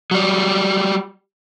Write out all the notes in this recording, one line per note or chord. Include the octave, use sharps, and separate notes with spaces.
F#3 G3